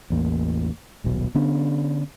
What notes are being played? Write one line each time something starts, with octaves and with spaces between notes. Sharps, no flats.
A1 E2 A#3
D#1 B1 B2
D3 B3 C#4 D4